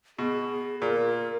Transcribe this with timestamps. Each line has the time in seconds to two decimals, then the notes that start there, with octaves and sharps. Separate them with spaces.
0.18 B2 G#4
0.82 A#2 A#4